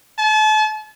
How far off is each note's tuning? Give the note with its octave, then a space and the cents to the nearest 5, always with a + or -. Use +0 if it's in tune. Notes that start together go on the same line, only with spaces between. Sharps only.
A5 -35